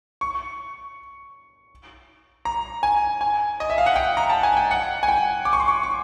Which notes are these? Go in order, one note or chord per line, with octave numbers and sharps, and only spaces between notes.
C#6
A#5
G#5
G#5
D#5
E5
F5
F#5
G5
A#5
A5
G#5
G5
F#5
G#5
G5
D6
C#6
C6
C#6
C#6